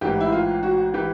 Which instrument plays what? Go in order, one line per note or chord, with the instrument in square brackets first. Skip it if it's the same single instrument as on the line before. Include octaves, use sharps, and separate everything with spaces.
[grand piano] A1 G#2 E3 [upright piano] G4
[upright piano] E4
F4
F#4
[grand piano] E3 [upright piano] G4